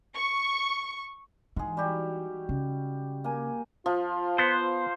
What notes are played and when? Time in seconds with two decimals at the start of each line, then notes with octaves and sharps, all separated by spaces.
0.15 C#6
1.56 G#2 E3 G#4
1.77 G3 F#4 G4
2.49 C#3
3.24 A#3 G#5
3.86 F3 F4
4.38 B3 C5